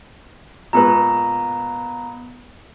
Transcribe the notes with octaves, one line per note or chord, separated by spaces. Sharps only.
A#2 G#3 B3 B4 A#5